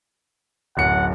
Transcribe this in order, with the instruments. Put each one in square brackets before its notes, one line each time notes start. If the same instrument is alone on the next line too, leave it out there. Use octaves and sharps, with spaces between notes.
[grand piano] D1 F#2 C#7 [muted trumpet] F#5